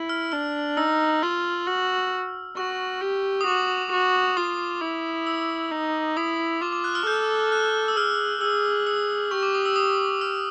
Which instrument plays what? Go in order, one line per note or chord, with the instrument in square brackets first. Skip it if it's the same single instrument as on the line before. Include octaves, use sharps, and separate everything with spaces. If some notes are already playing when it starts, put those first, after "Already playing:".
Already playing: [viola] E4
[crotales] F6
[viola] D4 [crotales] F6
[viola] D#4 [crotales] E6
[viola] F4
F#4
[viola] F#4 [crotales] C#6
[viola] G4
[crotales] D#6
[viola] F#4 [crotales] D6
[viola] F#4
[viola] F4 [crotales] D#6
[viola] E4
[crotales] E6
[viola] D#4
[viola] E4 [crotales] D#6
[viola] F4 [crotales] D6
[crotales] D6
F#6
F6
[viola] A4 [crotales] G6
[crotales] F#6
E6
[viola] G#4 [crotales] F6
[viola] G#4 [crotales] E6
[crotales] E6
[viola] G4 [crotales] C#6
[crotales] D6
D#6
E6
D#6
F6